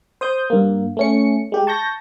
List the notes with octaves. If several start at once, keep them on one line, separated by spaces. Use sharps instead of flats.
C5 D#6 G6
G2 A#3
A3 C#4 C#7
G#3 G4
A5 C#6 G6 A#6